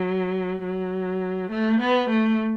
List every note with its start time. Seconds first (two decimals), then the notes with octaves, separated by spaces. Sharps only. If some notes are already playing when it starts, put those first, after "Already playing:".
Already playing: F#3
0.63 F#3
1.51 A3
1.81 B3
2.10 A3